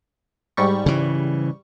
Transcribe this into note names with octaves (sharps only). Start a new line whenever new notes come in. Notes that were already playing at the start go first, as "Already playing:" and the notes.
G#2 G3 C#6
C#3 E3